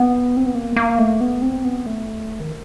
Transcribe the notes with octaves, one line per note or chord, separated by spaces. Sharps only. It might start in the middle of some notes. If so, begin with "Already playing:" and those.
Already playing: B3
C4
B3
A#3
A#3
A3
B3
C4
B3
A3
D#3